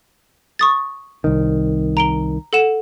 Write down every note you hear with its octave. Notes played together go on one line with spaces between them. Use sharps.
C#6 D#6 A6
C2 D#3
A#5 D7 G7
A4 F#5 E7